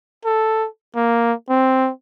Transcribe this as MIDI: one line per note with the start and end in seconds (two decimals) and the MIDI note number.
0.25 0.67 69
0.95 1.32 58
1.49 1.90 60